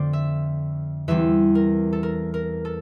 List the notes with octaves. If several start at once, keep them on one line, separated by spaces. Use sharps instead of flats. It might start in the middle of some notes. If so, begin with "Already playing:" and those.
Already playing: F2 D3 A3 C5 D5
E5
E2 E3 G3 C4 E5
A#4
A4
A#4
A#4
A4